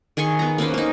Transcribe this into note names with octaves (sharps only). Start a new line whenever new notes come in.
D#3 G#4 C6 C#6
B3 A#5
A#3 C#4 B4 C5
A#3 D#4